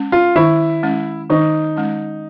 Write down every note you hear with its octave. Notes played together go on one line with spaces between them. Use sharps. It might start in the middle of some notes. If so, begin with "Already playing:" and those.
Already playing: G#3 C#4
F4
D#3 E4
G#3 C#4
D#3 D#4
G#3 C#4